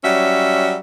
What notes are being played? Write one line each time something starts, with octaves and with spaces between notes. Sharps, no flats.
F#3 G3 C#4 E5